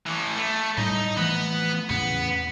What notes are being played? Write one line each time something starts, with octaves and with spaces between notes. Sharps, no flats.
A2 E3
A3
A2 G3 D#4 D#5
E3 F3 A3 B3
E2 A2 C#3 B3